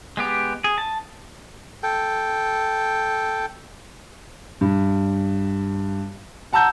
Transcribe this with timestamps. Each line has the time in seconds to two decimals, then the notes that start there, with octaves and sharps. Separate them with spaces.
0.17 G#3 B3 G4
0.64 G#4
0.78 A5
1.83 A4 G5
4.61 G2
6.52 F#5 A5 A#5 E6 G6